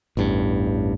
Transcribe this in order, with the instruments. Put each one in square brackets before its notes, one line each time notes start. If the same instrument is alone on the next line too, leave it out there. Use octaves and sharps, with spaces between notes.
[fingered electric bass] A1 E2 G2